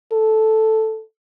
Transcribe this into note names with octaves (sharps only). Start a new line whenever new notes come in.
A4